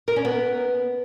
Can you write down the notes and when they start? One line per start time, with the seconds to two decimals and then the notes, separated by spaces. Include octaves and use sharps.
0.08 A#4
0.16 C#4
0.25 B3